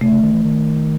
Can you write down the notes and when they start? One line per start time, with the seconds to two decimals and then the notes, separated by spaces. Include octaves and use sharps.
0.01 C3 A3
0.11 C#3
0.23 D#3
0.33 E3
0.45 D#3